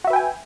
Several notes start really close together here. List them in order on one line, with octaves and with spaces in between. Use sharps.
F#4 E5 B4 G5 G#5